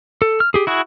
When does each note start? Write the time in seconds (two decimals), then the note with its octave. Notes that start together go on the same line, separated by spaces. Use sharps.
0.22 A4
0.40 F6
0.54 G4 G#4
0.67 E4 F#4 G#4